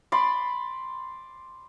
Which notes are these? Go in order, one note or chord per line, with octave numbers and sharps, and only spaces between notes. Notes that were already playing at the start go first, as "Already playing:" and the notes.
D5 B5 C6